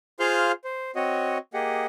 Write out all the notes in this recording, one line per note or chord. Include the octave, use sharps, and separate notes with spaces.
F4 G#4 C5 F5 F6 G6
C5
C4 F#4 C#5 D#5
A#3 G4 G#4 D#5 F#5